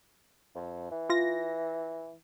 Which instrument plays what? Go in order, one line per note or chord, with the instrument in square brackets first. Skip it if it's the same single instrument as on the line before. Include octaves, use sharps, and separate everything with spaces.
[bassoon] F2
E3
[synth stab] F4 A#6